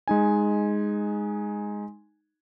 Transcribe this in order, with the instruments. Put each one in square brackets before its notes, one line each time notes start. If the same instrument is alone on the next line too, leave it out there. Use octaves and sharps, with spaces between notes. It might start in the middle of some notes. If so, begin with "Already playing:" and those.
[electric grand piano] G#3 D#4 G#5